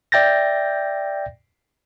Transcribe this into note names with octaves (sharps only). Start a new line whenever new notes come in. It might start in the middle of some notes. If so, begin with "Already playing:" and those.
D5 E5 G5 G6 A6 A#6